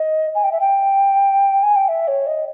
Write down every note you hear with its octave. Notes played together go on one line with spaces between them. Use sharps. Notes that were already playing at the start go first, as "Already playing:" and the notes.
Already playing: D#5
G#5
G5
E5
G5
G#5
G5
E5
C#5
D#5